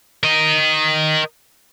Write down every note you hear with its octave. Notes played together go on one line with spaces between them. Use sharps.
A#4 D#5